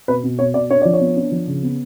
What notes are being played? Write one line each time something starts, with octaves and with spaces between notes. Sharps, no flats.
B2 B4
B2
B2 C#5
B2 D5
D4 C#5
F3 D5
C#5
B3
D4
F3
C#3
B3